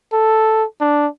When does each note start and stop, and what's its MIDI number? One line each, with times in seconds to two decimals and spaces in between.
0.13 0.65 69
0.81 1.07 62